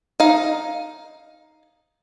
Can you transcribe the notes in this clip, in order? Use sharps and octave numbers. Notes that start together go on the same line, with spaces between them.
D#4 F5